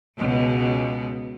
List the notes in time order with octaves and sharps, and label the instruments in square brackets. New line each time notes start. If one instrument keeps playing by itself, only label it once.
[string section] C#2 B2